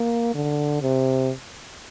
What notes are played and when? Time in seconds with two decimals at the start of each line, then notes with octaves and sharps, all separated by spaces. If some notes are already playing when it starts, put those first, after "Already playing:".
Already playing: A#3
0.35 D3
0.81 C3